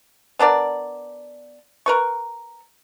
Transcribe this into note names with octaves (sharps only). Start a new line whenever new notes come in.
B3 D4 A#4 D5
A#4 B4 C#6